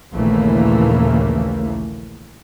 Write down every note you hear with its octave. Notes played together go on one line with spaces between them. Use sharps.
A#1 D#2 C#3 E3 A3 A#3